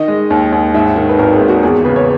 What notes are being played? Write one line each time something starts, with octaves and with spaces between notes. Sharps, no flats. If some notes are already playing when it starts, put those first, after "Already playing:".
Already playing: D#3 D#5
G#3
D#2
D#2
G#2 E5
D#3
B4
G#1 A#4
G#4
G#1
F#4
E2 G#4
C#3 B4
C#5